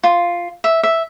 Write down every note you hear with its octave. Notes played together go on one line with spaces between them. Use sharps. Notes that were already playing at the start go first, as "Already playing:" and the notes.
F4
E5
E5